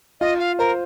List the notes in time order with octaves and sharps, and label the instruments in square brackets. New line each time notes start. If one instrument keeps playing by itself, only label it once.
[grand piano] F4 [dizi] D#5
[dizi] F5
[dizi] A#4 [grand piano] C5